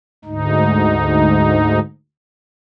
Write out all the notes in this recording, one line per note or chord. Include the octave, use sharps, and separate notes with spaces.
D2 G#2 D#4